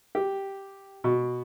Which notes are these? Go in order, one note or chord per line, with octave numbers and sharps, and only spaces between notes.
G4
B2